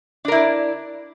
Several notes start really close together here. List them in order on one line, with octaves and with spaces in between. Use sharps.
D4 A#4 E4 D5